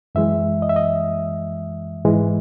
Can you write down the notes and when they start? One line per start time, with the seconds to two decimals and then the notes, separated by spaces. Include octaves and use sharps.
0.15 F#2 E3 G#3 E5
0.62 D#5
0.69 E5
0.76 D#5
2.05 G#2 E3 G#3